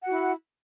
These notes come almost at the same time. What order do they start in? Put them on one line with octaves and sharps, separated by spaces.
F#5 F#4 E4